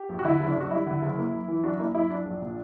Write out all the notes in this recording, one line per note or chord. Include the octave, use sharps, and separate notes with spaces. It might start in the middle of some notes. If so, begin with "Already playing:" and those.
Already playing: G4
A#1
F#4
D3 E4
F#1
D4
F#2
F#4
G3 E4
D3
F#1
A#3
F#2
E3
F#2 D4 F#4
A#3 E4
F#2 E4
F#3 D4
A#1
A#2